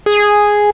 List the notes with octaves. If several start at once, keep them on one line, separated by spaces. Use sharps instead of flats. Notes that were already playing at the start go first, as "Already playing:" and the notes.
G#4